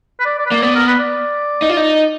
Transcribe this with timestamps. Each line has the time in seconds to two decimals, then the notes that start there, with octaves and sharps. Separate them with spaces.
0.20 B4
0.25 D5
0.39 D5
0.46 B4
0.50 A#3 D5
0.62 B3 D5
0.75 A#4
0.87 B4
0.99 D5
1.62 D#4
1.69 F4
1.77 D#4